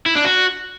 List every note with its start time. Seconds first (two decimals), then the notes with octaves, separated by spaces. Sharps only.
0.06 E4
0.15 D4
0.25 F#4